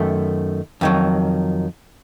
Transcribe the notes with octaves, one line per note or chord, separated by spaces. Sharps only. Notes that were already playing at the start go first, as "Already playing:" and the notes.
Already playing: F#2 D#3 A3
F2 D#3 F#3